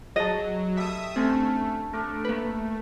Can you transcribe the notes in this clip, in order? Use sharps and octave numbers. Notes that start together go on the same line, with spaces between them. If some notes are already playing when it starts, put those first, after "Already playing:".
F#3 G#4 D#5 A5
G3 A3 E5 D#6
D3 A3 C4 C#4
A3 D4 A#4
A#3 B4